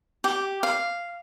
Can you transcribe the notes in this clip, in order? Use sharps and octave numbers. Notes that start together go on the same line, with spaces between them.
G4
F5